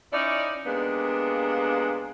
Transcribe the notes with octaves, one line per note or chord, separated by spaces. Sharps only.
C#4 D#4 E4 D5
C3 G#3 A#3 B3 D4